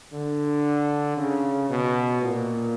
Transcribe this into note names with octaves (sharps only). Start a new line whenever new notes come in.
D3
C#3
B2
A#2